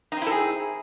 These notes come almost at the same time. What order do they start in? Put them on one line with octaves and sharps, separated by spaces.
D#4 C4 E4 A4 G#4